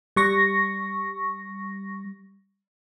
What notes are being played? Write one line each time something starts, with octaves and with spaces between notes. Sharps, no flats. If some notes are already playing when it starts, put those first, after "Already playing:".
G3 C#6 A#6